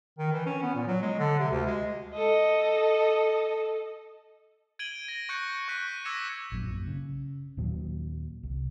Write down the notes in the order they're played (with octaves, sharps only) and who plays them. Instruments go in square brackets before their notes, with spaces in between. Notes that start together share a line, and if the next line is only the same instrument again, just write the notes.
[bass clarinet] D#3
E3
C#4
B3
A#2
F#3
G#3
D3
C3
D2
G#3
[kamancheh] A4 D#5
[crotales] G#6 D7 D#7 F#7 G7
A#6
C#6 F#6 G6 A#6 C#7
C#6 F#6 B6 D#7
D6 E6 G#6 A#6 C#7 E7
[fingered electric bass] A#1 F#2 A#2
C#3
D#2 A#2 F#3
C2